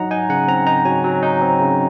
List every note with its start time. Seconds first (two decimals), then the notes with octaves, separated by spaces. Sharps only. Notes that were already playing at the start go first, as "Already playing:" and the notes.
Already playing: F#3 D#4 F#5 A#5
0.11 D#4 G#5
0.29 C#3 F#5
0.48 C4 A#5
0.67 D#4 A#5
0.85 F#3 G#5
1.04 F#3
1.23 D#4
1.42 C4
1.60 C#3